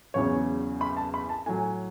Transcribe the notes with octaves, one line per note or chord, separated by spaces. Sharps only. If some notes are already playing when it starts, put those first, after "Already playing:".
E2 C#3 F#3 C#5
B5
A5
B5
A5
A2 F#3 G#5